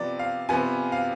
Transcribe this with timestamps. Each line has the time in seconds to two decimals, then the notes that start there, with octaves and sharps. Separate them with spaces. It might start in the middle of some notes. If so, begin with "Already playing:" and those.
Already playing: C3 F3 B3 D5
0.19 F5
0.49 C3 F3 B3 G#5
0.92 F5